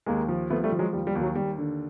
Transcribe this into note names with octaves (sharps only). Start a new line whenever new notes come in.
D#2 G#3 A#3
F3
F3 A3 B3
G3 A3
F3
F#3 G#3
D#2 G3
G3
D#2
F#3
D#2 G3
D3